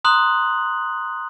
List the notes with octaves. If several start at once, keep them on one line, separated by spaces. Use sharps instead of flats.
A#5 C6 D#6 F#6 F#7